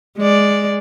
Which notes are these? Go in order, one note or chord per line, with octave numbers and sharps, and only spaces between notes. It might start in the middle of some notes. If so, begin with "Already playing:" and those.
G#3 D5